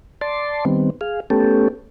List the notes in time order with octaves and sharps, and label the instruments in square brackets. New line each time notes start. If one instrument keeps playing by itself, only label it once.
[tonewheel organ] D5 A5 C6
D#3 G3 B3 C4
G#4 F5
A3 B3 C#4 G4 A4